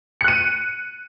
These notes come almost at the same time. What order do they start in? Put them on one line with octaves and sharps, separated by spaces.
C#7 F#6 D#7